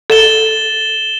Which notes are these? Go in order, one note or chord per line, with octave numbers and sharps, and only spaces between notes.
A4 A6 E7 G7